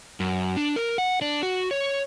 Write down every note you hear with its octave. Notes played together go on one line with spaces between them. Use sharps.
F#2
D4
A#4
F#5
D4
F#4
C#5